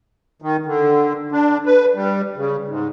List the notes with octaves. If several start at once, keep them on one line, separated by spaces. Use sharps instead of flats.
D#3
D3
D4
B4
G3
C#3
G#2